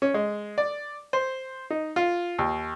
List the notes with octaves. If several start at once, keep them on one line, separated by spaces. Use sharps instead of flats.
C#4
G#3
D5
C5
D#4
F4
D#2